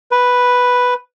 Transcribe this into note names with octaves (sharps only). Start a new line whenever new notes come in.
B4